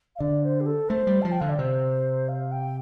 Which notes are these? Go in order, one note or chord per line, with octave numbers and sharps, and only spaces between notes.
F5
D3 D5
C5
G4
A4
A3 C5
G3
F3 A5
G5
D3 F5
D5
C3 C5
F5
G5